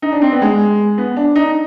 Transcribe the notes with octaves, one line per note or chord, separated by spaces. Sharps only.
D#4
D4
C4
B3
G#3
B3
D4
D#4